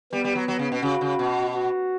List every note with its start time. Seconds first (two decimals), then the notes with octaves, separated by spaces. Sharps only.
0.12 G3 B3
0.24 G3
0.35 F#3
0.48 F#3
0.59 C#3
0.72 B2
0.82 C#3 F#4
1.01 C#3
1.19 B2
1.54 F#4